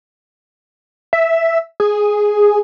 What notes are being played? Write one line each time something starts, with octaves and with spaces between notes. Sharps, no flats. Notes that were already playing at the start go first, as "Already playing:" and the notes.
E5
G#4